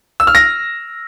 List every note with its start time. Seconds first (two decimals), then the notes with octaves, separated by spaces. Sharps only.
0.20 E6
0.27 F6
0.35 A#6